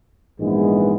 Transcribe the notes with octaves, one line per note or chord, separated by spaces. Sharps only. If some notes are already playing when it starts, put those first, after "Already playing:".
A#1 G#2 E3 G#3 B3